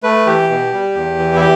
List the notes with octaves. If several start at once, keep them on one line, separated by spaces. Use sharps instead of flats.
A3 B4
E3 G4
B2
G3
E2
E3
E4
G4